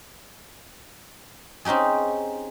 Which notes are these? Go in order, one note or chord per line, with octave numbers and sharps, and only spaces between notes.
C4 C#4 D#4 G4 G#4